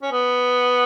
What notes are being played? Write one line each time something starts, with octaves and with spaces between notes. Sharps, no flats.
C#4
B3